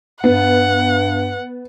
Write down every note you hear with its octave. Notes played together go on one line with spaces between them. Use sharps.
G2 B3 F#5